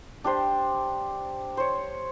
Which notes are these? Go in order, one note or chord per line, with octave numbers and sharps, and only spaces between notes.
D4 G4 C5
C5 C#5